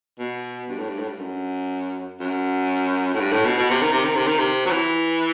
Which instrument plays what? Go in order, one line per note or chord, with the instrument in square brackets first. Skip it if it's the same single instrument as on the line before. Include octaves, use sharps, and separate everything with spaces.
[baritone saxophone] B2
G2
A2
G2
A2
G2
F#2
F#2
A2
G2
A2
B2
B2
C3
D#3
C3
D#3
C3
D#3
C3
F#3
E3